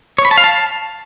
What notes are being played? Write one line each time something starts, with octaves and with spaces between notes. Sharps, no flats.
C#5
B5
A5
F5
A5